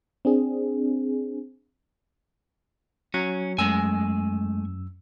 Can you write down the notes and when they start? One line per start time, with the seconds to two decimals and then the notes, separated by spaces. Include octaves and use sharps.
0.25 C4 D4 G#4
3.14 F#3 C#4
3.58 F#2 G#3 A3 G#5 E6